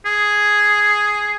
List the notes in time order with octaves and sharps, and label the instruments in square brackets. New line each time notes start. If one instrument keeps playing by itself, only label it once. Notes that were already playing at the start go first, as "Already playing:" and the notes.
[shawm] G#4